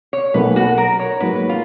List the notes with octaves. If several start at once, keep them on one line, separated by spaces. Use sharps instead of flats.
C#5
B1 B2 A#3 B4
F#4
A#4
C#5
G#2 F#3 A#3 B4
F4